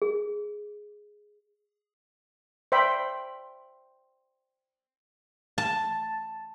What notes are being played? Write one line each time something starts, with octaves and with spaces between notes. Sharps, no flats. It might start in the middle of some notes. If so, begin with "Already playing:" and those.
G#4
C5 D5 E5 G5 B5
A5